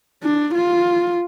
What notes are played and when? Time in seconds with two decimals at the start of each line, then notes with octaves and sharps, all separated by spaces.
0.23 D4
0.55 F4